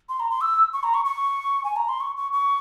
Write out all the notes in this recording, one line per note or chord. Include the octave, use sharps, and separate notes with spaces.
C6
A#5
C6
E6
C#6
A#5
C#6
C#6
G#5
A#5
C6
C#6
C#6
C#6